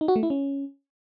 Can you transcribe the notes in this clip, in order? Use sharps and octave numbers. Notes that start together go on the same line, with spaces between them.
D#4
F#4
A3
E4
C#4